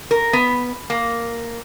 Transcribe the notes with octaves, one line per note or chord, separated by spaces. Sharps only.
A#4
B3
A#3